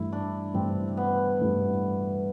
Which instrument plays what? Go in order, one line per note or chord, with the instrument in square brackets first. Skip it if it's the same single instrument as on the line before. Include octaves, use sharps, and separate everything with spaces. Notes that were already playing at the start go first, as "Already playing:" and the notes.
Already playing: [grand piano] G2 E3 A3 [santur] E4
[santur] D4
[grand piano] G2 E3 A3 [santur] C4
[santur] B3
[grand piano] G2 E3 A3